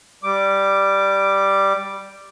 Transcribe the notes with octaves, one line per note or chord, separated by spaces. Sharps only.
G3 D6